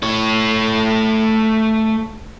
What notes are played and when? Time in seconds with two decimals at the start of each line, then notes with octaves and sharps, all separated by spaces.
0.03 A3 C#5